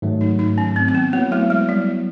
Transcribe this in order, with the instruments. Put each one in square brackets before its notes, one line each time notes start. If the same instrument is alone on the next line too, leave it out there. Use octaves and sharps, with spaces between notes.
[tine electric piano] G#2 D#3 F#3 A3
[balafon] D#4
D#4
C#4
C4
C4
B3
[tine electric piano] F#3 B3 E4 [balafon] A#3
[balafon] A3
G#3
G3